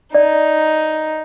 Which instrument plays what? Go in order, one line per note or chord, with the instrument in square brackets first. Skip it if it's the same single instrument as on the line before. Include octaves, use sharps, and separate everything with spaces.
[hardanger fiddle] D#4 [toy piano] D5